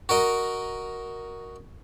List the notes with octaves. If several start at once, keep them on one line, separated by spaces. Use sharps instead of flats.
F#4 A#4 D#5